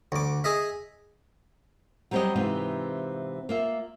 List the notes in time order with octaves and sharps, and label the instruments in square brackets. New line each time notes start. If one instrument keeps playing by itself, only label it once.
[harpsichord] D2 D6
G#4 D#5 E5
[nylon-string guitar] F#3 G3 C4 G4 C#5 D#5
G#2 C3 E3 C4 F4
A#3 F4 E5